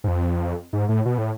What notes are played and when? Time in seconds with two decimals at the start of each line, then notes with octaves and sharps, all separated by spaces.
0.04 G#2
0.08 F2
0.73 G#2
0.89 A2
1.06 B2
1.18 A2